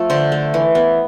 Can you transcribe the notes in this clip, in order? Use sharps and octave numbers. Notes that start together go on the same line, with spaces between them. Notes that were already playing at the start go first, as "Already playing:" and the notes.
Already playing: F3 A3 F4
D3 C5
A3
E3
B3